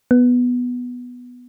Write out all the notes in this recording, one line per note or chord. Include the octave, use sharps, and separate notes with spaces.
B3